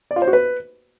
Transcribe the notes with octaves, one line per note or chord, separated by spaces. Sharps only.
D5
F4
C5
F#4
B4